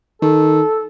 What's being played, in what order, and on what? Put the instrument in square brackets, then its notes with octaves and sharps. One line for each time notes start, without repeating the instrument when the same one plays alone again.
[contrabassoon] D#3 [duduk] A4